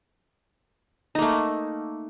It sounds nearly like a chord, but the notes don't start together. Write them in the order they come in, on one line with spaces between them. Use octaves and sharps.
D#4 A#3 A3